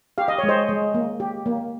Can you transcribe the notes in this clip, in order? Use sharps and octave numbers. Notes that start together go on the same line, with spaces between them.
G4 F5
D#5
G#3 C#5
C5 D#5
G#3
A#3
G4
A#3